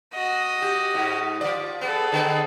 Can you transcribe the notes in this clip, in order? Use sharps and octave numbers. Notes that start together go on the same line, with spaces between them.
F#4 D#5
G4
G#2
F3 D5
B3 G#4 A4
D3 B3 C4